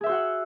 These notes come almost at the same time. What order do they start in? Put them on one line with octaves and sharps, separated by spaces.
G#4 E5 C5 F#4 F#5